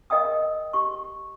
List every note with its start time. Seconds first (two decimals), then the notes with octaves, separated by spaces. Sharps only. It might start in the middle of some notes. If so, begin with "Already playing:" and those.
0.10 A#4 D#5 F5 G5 D#6
0.73 G4 C#6